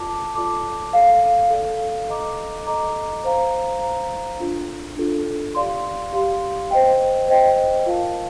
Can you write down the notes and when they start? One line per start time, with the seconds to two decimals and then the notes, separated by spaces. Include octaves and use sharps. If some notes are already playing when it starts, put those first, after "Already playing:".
Already playing: F4 A4 D5 A5 D6
0.35 F4 A4 D5 A5 D6
0.93 A4 D5 F5
1.51 A4 D5 F5
2.08 A4 D#5 A#5 D6
2.66 A4 D#5 A#5 D6
3.24 C5 F5 A#5
3.81 C5 F5 A#5
4.40 D4 F4 A4
4.97 D4 F4 A4
5.55 G4 D5 F5 C6
6.13 G4 D5 F5 C6
6.71 C5 D#5 G5
7.28 C5 D#5 G5
7.86 F4 A#4 F5 A5